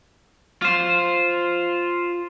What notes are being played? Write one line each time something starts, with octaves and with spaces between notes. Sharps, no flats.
F4 C5